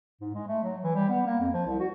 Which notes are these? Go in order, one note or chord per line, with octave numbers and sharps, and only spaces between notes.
G#2
G#3
A3
F#3
E3
G3
B3
A#3
F2
F3
C2
F#4